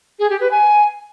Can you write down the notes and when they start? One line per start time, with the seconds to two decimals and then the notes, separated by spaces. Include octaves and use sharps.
0.19 G#4
0.30 G4
0.41 B4
0.51 G#5